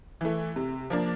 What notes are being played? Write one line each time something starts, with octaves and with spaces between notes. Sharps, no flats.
E3 A3
C3
F3 A#3 D4